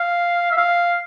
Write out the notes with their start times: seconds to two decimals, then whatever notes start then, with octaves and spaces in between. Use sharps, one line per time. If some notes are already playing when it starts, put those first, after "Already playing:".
Already playing: F5
0.52 E5
0.57 F5